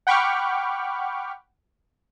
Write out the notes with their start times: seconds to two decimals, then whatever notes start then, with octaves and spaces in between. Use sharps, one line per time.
0.07 F#5 G5 B5 C#6 D6 F6